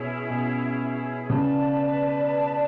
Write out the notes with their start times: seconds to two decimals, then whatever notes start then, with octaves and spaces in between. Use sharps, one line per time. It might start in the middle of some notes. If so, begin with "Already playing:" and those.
Already playing: B2 C#4 E4 G#4
0.30 B2
1.30 C#3 B4 D5 A5